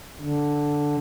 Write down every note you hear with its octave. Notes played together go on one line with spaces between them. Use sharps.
D3